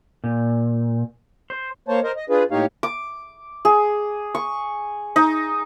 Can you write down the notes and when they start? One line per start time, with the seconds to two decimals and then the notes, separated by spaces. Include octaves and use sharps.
0.24 A#2
1.50 C5
1.88 A#3 C5 C#5 A5
2.04 A#4 C5 D#5
2.17 D#5
2.30 D4 F4 G#4 B4
2.51 A2 A#3 D#4 G4 C#5 F5
2.83 D6
3.65 G#4
4.35 C#6
5.16 D#4